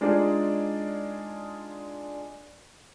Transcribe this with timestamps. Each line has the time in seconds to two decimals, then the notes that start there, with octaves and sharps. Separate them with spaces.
0.01 G#3 D4 D#4 F4 G#4 D5